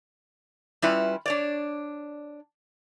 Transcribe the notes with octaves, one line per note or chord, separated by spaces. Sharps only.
G3 C#4 E4 F4 B4
D4 C#5 D5